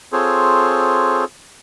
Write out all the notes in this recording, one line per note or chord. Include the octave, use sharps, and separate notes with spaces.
C4 F4 G#4 A4 C5 C#5